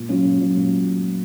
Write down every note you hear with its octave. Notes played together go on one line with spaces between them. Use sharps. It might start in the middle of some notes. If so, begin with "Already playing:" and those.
Already playing: A#2
F#3 C#4 F4
A#2
F#3 C#4 F4
A#2